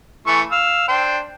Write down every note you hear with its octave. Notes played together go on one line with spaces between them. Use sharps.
E3 A3 C#6
F5 E6
D4 C5 G5